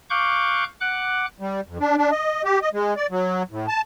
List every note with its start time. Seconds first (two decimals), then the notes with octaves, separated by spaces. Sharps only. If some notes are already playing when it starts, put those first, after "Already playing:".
0.10 F5 C#6 D6 F#6 G6
0.81 F#5 D6 F#6
1.40 G3
1.67 F2
1.80 D4
1.97 D4
2.11 D#5
2.44 G4
2.62 D#5
2.73 G#3
2.97 D5
3.10 F#3
3.51 A2
3.68 A5